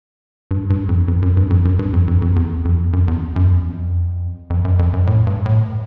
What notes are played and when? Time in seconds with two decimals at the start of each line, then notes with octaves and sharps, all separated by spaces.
0.51 G2
0.70 G2
0.89 F2
1.08 F2
1.22 F#2
1.37 G2
1.50 F2
1.65 F#2
1.79 G2
1.93 F2
2.08 F2
2.22 F2
2.36 E2
2.65 F2
2.75 E2
2.79 F2
2.93 F#2
3.08 E2
3.36 F#2
3.49 F2
3.62 E2
3.75 F2
4.50 F2
4.65 F#2
4.79 F2
4.93 F#2
5.07 A2
5.27 G2
5.46 A2